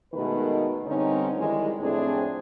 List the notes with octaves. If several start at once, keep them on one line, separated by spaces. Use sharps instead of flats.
B2 D#3 G#3 A3 A#4 B4
G2 D3 C4 C#4 D#4
D#3 E3 G3 G#3
F2 A2 A3 C4 D4 G#4